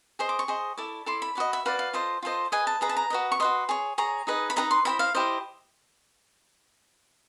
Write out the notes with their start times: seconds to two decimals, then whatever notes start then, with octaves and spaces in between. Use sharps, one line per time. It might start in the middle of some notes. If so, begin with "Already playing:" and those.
0.19 G#4 C5 D#5 C6
0.29 D6
0.39 C#6
0.48 G#4 C5 D#5
0.77 E4 A4 D5
1.06 E4 A4 D5 C6
1.22 B5
1.35 F#4 B4 D5 D#5
1.53 E5
1.65 F#4 B4 D5 F5
1.79 F5
1.93 F4 A4 C5 D#5
2.23 F4 A4 C5 D#5
2.52 G#4 B4 D#5 G#5
2.67 A5
2.81 G#4 B4 D#5 A#5
2.89 A5
2.97 A#5
3.10 F#4 B4 D#5
3.32 C#6
3.40 F#4 B4 D#5 C6
3.69 G#4 C#5
3.98 G#4 C#5 A#5
4.27 D#4 G#4 B4 D#5
4.50 B5
4.56 D#4 G#4 B4 D#5 A#5
4.71 C6
4.85 E4 G4 C5 D#5 B5
4.99 F5
5.15 E4 G4 C5 D#5